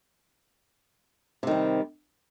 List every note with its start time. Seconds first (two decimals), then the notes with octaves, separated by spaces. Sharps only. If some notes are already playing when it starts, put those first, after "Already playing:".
1.43 C3
1.47 D#3
1.51 G3